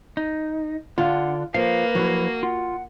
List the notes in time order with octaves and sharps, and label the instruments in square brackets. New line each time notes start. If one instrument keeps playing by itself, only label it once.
[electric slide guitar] D#4
[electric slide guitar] D3 D4 [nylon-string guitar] F4 [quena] F#5
[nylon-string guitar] F3 [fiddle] A#3 [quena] B4 [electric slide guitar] F5
[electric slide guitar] F3 F#3 E4 [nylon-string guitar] F#4
[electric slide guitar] F4 [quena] F#5